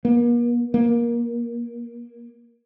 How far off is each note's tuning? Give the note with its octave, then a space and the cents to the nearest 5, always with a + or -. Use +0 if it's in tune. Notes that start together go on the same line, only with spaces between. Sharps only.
A#3 +45
A#3 +20